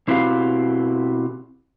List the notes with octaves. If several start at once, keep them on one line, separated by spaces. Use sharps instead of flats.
B2 C4 E4 F#4 G4 F5